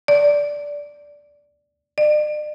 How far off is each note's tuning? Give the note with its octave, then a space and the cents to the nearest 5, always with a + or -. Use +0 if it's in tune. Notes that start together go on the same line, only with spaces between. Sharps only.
D5 -10
D5 +45